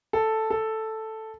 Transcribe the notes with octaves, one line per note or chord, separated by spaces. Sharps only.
A4
A4